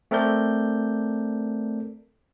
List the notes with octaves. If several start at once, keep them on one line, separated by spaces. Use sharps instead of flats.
A3 C4 A4 A#4 D5 G6